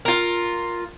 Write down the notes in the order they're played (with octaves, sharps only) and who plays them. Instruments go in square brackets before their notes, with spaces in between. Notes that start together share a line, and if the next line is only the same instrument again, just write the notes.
[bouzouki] F4 A#4